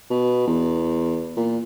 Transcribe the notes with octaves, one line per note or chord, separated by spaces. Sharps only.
B2
E2
A#2